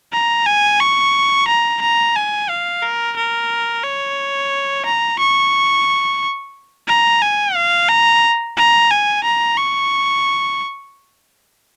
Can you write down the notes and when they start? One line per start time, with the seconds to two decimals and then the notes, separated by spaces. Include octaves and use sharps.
0.13 A#5
0.46 G#5
0.80 C#6
1.48 A#5
1.82 A#5
2.15 G#5
2.49 F5
2.83 A#4
3.17 A#4
3.84 C#5
4.85 A#5
5.19 C#6
6.88 A#5
7.22 G#5
7.55 F5
7.89 A#5
8.57 A#5
8.91 G#5
9.24 A#5
9.58 C#6